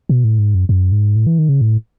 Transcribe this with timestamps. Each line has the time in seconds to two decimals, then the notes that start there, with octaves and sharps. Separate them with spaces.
0.09 B2
0.24 A2
0.39 G#2
0.55 F#2
0.69 F#2
0.92 G#2
1.16 A2
1.27 E3
1.39 D#3
1.49 C#3
1.61 A2